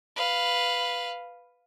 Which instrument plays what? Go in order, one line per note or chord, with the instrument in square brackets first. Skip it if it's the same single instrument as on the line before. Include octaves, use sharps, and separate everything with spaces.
[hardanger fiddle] B4 F5